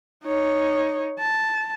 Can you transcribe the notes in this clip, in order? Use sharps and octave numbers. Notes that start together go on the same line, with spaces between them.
D#4 C#5
A5